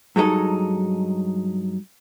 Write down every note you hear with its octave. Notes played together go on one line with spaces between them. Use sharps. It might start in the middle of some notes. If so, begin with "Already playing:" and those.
G2 F#3 G#3 D#4 A4